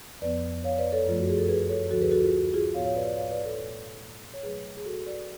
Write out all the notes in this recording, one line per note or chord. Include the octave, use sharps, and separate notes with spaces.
F2 F3 B3 B4 D5
C#5 F5
B4 D5
A4 C#5
F#2 F3 A3 F4
F#4
G#4
A4
G#4 B4
A4 C#5
D2 D3 F3 F#4 A4
G#4 B4
F#4 A4
F4 G#4
F#4
F4 G#4
A2 F3 B3 C#5 F5
C#5 F5
B4 D5
B4 D5
C#5 F5
B4 D5
A4 C#5
B2 A3
C#5
B2 F#3 A3 G#4 B4
G#4
F#4 A4
B4 D5